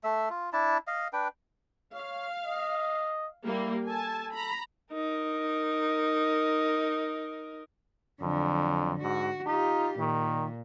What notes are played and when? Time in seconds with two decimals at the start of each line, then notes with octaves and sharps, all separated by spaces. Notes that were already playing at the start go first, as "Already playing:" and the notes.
0.04 A3 E5
0.30 F4
0.53 D4 E4 A5
0.87 D#5 F5
1.13 D4 B4 G5
1.94 C#5 F5
2.44 D#5
3.46 G3 A#3 E4
3.88 A4 G#5 A5
4.33 A#5 B5
4.93 D#4 A#4
8.21 F2 D3 F#3
9.02 G#2 F#4
9.47 D#4 F4 G4
9.99 A#2 D#3